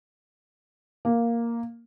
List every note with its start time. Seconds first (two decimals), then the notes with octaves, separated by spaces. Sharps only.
1.05 A#3